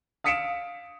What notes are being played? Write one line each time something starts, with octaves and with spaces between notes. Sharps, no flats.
F5 D#6 B6 C#7 D7 E7